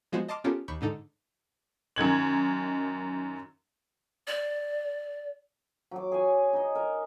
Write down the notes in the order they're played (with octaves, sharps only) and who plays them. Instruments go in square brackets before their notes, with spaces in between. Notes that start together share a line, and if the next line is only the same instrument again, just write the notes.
[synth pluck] F3 G#3 B3 F#4 C5
D#5 A5 C6 D6 F6
B3 C#4 F4 G4 A4 A#4
D#2 B5 C#6 G6
G#2 D3 D#4 A4
[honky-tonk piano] F#2 D#3 G#6 F#7
[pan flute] D5
[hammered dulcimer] F#3 D6
G#4 C#5 G#5
D#4 D#5
A#4